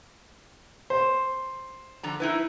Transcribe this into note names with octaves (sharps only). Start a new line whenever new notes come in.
C5
D3 F3 A#5
D#4 E4 B4